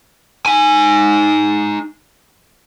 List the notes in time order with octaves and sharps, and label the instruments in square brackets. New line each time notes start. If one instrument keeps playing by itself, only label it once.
[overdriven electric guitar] D#4 G#5